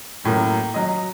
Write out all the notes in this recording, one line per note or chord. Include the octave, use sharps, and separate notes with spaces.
F#2 A2 F#3 A#3
F#3 D#5